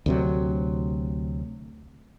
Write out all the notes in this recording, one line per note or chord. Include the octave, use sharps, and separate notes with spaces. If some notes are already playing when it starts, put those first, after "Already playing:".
D2 C3 F#3